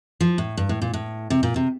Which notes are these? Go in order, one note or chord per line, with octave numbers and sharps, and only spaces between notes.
F3
A2
G2
A2
A#2
A2
C3
A#2
C3